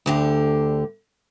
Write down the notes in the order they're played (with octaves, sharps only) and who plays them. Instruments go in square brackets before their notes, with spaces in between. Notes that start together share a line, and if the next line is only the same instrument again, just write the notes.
[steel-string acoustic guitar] D2 D3 G4